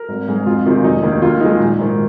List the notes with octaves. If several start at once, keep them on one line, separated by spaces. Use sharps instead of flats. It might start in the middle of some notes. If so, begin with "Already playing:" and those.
Already playing: A#4
G#1
G#2 G#3
F2 F4
C3 D#3 G#3 F4
F1 D#4
D#2 D#3
D#2 F4
D#3 G#3 D#4
A#1
G#2 D#3